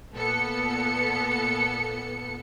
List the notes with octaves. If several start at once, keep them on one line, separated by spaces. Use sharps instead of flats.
A#2 B3 A4 C#7